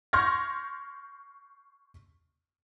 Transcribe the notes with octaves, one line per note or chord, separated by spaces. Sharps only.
C6 C#6 F6 G6 G#6 A#6